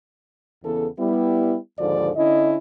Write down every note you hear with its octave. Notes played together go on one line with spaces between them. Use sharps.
E2 C#3 E3 B3 A4
G3 B3 E4
D#2 G#2 D3 F3 A4 D5
D3 C#4 E4 D#5